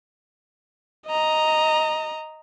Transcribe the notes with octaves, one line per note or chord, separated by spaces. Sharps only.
D#5 A#5